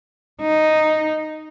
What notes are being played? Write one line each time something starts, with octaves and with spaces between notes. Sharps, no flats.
D#4